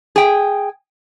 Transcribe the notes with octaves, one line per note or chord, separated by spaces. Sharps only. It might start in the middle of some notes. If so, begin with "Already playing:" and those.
G#4 G5